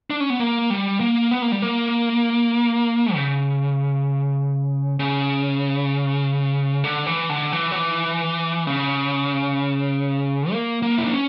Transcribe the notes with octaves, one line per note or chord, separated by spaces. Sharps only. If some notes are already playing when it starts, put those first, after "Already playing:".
D4
C#4
B3
A#3
G3
A#3
B3
A#3
G3
A#3
C#3
C#3
D3
E3
D3
E3
F#3
E3
C#3
A#3
A#3
E4
D4
C#4